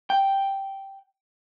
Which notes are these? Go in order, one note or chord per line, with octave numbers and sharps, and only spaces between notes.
G5